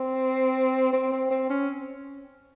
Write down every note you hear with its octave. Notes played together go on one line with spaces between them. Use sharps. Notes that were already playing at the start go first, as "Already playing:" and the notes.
Already playing: C4
C4
C4
C4
C#4